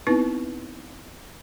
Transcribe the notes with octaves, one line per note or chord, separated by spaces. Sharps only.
B3 C4 D#4 E4 B4